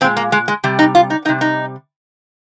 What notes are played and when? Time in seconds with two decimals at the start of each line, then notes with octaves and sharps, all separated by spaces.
0.01 A#2 C4
0.04 G#3
0.17 A#3
0.32 G#3
0.48 G#3
0.64 C3 G3
0.79 D#4
0.95 F4
1.10 D#4
1.25 G3 D#4
1.29 C3
1.41 D#4